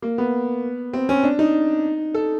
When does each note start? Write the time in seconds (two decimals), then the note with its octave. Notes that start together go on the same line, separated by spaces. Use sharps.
0.02 A#3
0.18 B3
0.94 C4
1.09 C#4
1.23 D4
1.39 D#4
2.14 A4